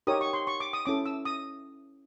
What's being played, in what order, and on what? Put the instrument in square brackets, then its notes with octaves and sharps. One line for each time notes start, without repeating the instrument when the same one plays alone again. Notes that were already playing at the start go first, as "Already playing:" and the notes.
[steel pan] D#4 G4 A#4 C#5 D#6
C#6
C6
C#6
D6
D#6
C#4 E4 A4 D6
E6
D#6